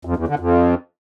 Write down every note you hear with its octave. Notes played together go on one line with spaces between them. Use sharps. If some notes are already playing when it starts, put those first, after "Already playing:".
F2
E2
D3
F2